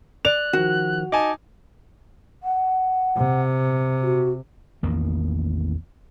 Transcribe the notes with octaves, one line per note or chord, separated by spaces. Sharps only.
D5 F#6 F7
D#3 F3 F#4
D#4 G#5 A5 D6
F#5
C3
F#4
A1 E2 D#3 A#3